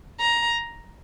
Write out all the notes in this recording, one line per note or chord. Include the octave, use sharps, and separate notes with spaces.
A#5